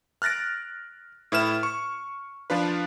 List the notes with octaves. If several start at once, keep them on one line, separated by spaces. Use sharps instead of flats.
F6 F#6 A6 A#6 D7
A2 E4 B4 F6 E7
C#6
F3 D4 F4 B4